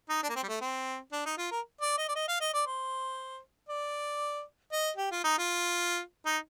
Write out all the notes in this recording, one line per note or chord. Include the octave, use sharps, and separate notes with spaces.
D#4
D4
A#3
C4
G3
A3
C4
D4
D#4
F4
A#4
D5
D#5
D5
D#5
F5
D#5
D5
C5
D5
D#5
G4
F4
D#4
F4
D#4